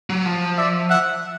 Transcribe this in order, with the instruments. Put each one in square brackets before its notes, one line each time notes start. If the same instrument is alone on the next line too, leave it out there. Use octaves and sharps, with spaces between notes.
[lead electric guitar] F#3
F3
[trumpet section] D5 E5
E5 F#5